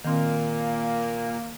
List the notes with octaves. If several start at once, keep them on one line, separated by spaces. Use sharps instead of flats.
A#2 D#3 A#3 C4